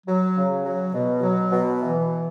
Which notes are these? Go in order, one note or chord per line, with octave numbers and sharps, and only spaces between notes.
F#3
C#3
F#3
B2
F#3
B2
E3